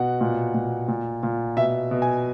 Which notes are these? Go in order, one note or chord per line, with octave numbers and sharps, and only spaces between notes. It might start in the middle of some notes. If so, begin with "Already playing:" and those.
Already playing: B2 F#5
A#2
A#2
A#2
A#2
B2 E5
B2
G#5